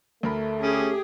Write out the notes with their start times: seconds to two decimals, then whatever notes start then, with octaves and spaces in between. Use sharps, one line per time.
0.23 D2 A3 A#4 B5
0.62 C#4 G4 G#4